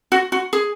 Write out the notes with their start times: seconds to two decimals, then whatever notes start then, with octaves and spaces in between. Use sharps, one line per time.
0.12 F#4
0.32 F#4
0.53 G#4